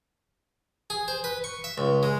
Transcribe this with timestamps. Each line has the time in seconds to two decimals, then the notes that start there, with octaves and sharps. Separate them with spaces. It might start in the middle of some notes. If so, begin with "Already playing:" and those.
0.90 G#4
1.08 C5
1.24 B4
1.44 C#6
1.64 E5
1.78 C#2
2.03 G#3